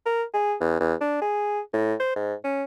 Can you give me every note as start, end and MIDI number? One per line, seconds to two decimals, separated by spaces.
0.06 0.23 70
0.34 0.55 68
0.60 0.80 40
0.80 0.94 40
1.01 1.17 62
1.22 1.60 68
1.73 1.94 45
2.00 2.13 72
2.16 2.34 44
2.44 2.64 61